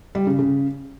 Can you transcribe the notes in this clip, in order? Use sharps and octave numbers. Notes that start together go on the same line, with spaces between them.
G3
C#3
C#3